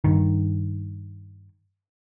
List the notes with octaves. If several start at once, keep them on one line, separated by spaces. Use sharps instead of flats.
G2 D#3